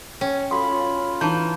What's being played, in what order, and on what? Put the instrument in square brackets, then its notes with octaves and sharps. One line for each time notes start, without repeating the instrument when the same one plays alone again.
[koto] C#4 [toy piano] G5
[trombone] F4 [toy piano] F#4 A4 D#6 [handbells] B5 C6
[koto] E3 [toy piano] D#4 A5 A#5 [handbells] G6